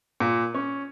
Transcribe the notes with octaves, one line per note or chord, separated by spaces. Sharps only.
A#2
C#4